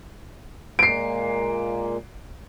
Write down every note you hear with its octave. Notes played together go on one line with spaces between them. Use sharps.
A#2 G#3 A#3 C7 D7